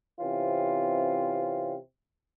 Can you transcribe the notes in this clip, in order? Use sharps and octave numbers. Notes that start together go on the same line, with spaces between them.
C3 E3 C4 C#4 F4